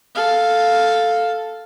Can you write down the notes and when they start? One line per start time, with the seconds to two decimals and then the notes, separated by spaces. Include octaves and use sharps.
0.15 A4 F5